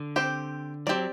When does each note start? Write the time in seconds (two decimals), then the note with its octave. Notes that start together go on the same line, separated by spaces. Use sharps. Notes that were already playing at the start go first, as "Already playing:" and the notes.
Already playing: D3
0.16 C4 G4 C5
0.87 F#3 C4 G4 D5